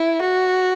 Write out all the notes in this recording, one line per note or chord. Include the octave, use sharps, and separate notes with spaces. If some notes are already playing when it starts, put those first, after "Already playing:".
Already playing: E4
F#4